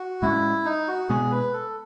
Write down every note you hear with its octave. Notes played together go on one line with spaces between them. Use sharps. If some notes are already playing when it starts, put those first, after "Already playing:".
Already playing: F#4
A2 G#3 C#4 E4
D#4
F#4
B2 G#3 B3 G#4
B4
A4